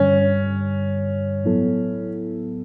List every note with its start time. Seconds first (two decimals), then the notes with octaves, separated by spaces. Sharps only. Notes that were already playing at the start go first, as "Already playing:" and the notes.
Already playing: G2 D3 G3 C#4
1.44 A2 F#3 B3 E4 A4